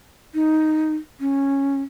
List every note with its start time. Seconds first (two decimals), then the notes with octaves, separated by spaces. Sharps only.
0.34 D#4
1.20 C#4